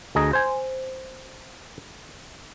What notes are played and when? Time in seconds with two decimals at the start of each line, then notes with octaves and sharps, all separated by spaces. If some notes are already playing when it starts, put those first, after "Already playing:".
0.15 D2 G#4 D#5 A#5
0.33 C5 G#5